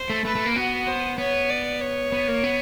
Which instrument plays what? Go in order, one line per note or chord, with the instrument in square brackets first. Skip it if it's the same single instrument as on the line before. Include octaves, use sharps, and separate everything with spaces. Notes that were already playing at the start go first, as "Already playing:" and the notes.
Already playing: [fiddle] C5
[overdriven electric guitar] A3
[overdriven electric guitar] A3 [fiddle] B4
[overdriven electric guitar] A3
A#3
[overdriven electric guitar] B3 [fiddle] F#4
[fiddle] C5
[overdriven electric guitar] B3 [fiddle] C#5
[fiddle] D5
C#5
[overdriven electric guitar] B3
A#3
B3